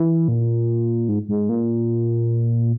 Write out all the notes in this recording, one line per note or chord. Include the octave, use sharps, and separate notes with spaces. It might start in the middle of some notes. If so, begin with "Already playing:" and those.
Already playing: E3
A#2
G#2
G#2
A#2